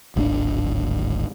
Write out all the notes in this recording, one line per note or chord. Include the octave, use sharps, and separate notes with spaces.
D1 G#1 C4 D4